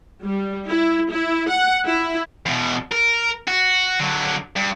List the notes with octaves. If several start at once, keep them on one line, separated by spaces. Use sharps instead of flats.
G3
E4
E4
F#5
E4
E2 B2
A#4
F#4
D3 F#3
G2